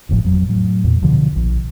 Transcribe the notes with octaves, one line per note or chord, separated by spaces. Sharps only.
D#1 G#1 A2 F3
F2 F#3
A2 F#3
E2 A#2
D2 B2 D3 F3
A#1